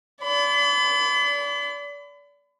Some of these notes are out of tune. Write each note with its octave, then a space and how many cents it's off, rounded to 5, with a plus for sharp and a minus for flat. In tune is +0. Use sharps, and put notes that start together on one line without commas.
D5 -35 B5 +35